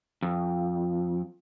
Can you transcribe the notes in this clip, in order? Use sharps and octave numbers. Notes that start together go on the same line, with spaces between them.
F2